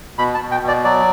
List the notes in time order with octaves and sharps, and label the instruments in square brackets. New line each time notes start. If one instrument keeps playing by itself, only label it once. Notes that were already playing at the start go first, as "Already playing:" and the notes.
[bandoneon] B2 B5
A5
B2
G5
B2
D5
F#3 D5